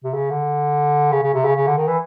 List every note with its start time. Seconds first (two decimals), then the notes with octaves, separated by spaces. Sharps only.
0.04 C3
0.14 C#3
0.30 D3
1.12 C#3
1.23 C#3
1.34 C3
1.45 C#3
1.56 C#3
1.67 D3
1.77 D#3
1.87 E3